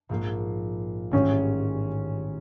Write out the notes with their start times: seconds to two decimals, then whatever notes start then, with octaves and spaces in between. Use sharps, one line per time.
0.09 A#1 G#2 F3 A#3
1.11 A1 G#2 D#3 G3 C#4